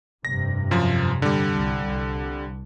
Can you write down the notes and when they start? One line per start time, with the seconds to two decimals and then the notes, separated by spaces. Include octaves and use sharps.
0.25 F1 G2 C3 A#6
0.71 F#2 F3
1.22 D3 G3
1.56 C2
1.87 C2